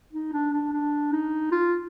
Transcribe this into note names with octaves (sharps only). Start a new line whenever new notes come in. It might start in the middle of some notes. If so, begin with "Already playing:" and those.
D#4
D4
D4
D4
D#4
F4